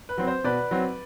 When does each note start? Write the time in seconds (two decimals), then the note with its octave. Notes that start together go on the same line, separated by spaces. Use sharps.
0.09 B4
0.18 F#3 C4
0.27 C5
0.44 B2 B4 D5
0.71 F#3 C4